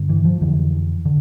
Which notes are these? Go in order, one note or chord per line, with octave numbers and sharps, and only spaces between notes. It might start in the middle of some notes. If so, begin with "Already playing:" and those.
Already playing: G2 D3
E3
F3
F2 D3 E3
D3